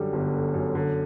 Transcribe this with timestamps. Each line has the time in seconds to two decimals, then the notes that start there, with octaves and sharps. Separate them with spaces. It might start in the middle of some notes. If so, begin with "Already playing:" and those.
Already playing: F#2 D3 G3
0.13 G1
0.34 D3
0.54 F#2
0.75 D3